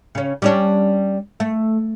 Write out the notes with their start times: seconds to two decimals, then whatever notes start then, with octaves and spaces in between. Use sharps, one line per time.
0.15 C#3 C#4
0.42 G3 C#4 D4
1.40 A3